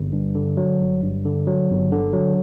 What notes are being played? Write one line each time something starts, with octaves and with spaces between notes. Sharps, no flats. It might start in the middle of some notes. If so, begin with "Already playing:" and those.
Already playing: G1
G2
D3
F#3
G1
G2
D3
F#3
G1
D3
F#3